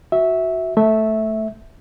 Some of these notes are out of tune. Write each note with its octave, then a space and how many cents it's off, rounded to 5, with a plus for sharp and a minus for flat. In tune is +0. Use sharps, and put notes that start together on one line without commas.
F#4 +0 E5 -10
A3 +0 E5 -10